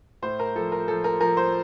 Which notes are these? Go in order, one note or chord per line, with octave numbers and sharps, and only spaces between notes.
A2 C5
A#4
F3 A4
A#4
F3 A4
A#4
F3 A#4
C5